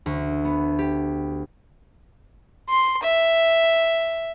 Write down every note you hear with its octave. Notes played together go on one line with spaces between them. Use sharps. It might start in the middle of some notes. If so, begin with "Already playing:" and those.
D2
B3
G4
C6
E5